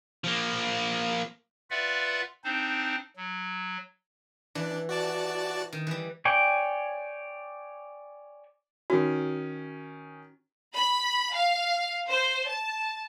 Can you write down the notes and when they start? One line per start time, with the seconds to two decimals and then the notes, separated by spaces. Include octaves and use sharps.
0.24 F3 A#3
1.71 F4 B4 D5 E5 F#5
2.44 C4 D4 D#4 C5
3.16 F#3
4.55 E3 D4
4.89 F#4 D5 A5
5.73 D#3
5.87 E3 G3
6.25 C#5 D5 G5 G#5
8.90 D#3 C#4 F#4
10.75 B5
11.33 F5
12.08 C5
12.48 A5